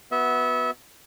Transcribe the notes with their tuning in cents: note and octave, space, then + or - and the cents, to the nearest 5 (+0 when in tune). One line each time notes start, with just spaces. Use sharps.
B3 +0 F#4 +0 E5 -25